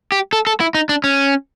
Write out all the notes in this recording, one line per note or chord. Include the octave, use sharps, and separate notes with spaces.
G4
A4
A4
E4
D#4
D4
C#4